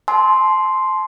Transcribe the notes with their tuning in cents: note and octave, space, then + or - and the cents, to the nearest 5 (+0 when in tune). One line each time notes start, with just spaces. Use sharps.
A5 -35 C6 +0 E6 -35